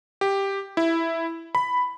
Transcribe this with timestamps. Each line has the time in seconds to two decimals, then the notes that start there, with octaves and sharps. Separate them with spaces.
0.21 G4
0.77 E4
1.55 B5